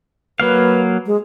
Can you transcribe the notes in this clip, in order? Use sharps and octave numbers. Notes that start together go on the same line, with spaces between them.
F#3 A#3 B4 F5
G#3